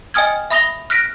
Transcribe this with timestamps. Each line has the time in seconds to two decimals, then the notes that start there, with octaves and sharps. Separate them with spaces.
0.14 D#5 G5 G#5 D#6 F6 G#6
0.50 E5 B5 D#6 A#6 F7 G7
0.90 F6 F#6 A#6 B6 D7